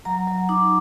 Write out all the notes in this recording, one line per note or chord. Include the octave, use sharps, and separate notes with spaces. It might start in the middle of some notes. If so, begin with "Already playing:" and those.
F#3 A#5
F#3
D#4 D6